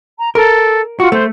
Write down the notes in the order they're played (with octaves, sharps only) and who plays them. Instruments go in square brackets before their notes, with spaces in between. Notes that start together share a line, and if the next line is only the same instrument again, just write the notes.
[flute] A#5
[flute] A4 [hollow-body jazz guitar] A#4
[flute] F4 [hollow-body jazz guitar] F#4
[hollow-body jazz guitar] A3 [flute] C5